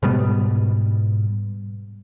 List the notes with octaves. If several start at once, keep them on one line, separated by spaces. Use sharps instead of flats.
G#2 B2 G3 B3